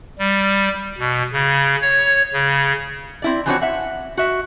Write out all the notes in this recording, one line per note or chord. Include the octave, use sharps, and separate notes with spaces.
G3
B2
C#3
C#5
C#3
C4 E4 D5
E3 F3 C4 D4 F#4 C#5
E5 F#5
F#4 E5